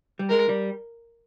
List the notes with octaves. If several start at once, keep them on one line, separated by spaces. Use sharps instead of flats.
G3
G#3 A#4
G3